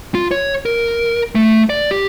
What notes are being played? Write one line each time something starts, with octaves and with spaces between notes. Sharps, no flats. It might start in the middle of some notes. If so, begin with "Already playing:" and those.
F4
C#5
A#4
A3
D5
G4